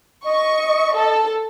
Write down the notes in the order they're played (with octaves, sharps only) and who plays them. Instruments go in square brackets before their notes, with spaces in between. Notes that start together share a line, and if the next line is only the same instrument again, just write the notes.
[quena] D#5 [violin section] C#6
[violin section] A4